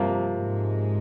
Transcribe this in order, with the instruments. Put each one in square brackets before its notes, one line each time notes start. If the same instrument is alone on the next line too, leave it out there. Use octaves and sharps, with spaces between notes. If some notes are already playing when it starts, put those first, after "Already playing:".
Already playing: [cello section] G2 G3 [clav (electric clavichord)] C3 F3 A#3
[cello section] G#2 G#3